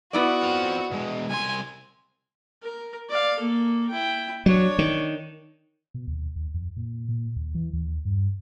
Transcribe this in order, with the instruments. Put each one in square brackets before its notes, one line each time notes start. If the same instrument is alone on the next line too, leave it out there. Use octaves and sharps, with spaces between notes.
[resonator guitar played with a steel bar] B3 E4 D5 [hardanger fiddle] F#4
[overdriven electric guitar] C4 F4
B2 G#3
[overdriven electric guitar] C2 C6 [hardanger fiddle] G#5
[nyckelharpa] A#4
D5 F5
A#3 A4
E4 G5
[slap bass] F#3 [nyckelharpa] D4 C#5
[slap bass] D#3
[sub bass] B2
D#2
D#2
F2
A#2
A#2
D#2
E3
D#2
G2